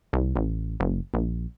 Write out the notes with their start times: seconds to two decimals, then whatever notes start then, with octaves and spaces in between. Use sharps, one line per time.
0.13 C2
0.36 A1
0.80 F#1
1.14 A#1